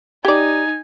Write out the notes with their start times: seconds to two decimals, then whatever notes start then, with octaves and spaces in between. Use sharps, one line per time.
0.25 D#4 G4 D5 G#5